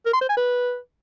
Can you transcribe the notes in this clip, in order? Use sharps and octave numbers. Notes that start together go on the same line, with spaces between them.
A#4
C6
C5
G#5
B4